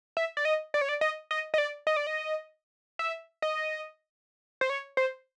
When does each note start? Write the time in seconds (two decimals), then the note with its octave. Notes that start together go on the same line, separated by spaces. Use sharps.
0.17 E5
0.37 D5
0.45 D#5
0.74 D5
0.81 C#5
0.89 D5
1.01 D#5
1.31 D#5
1.54 D#5
1.58 D5
1.87 D#5
1.97 D5
2.07 D#5
2.99 E5
3.42 D#5
4.61 C5
4.70 C#5
4.97 C5